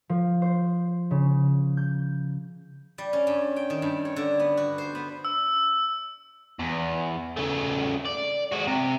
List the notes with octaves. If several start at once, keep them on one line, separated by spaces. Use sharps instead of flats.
F3
C5
C#3
G6
G3
C#4
G2
G5
D#3
G2
C#5
D3
B3
F#4
C5
B3
E6
E2
C#3 A3
D5
G#3 F#4
C3